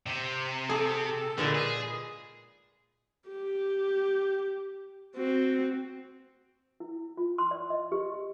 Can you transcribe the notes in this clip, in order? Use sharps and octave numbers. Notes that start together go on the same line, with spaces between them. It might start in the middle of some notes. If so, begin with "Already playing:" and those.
C3
G#4 A4
A#2 D3 G#3 B4
G#4
G4
C4 F#4
E4
F4
C6
D5
D#5
G4